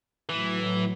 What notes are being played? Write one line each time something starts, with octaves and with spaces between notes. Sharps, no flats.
A2 E3 F#3